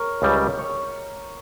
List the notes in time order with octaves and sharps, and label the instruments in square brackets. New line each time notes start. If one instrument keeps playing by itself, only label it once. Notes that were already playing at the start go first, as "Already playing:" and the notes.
Already playing: [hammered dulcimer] A#4 C#5
[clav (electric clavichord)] C#2 C#3 G3
[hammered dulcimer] C#5